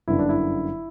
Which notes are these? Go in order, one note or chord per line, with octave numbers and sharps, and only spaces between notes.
G1 F#2 D3 E4
D4
E4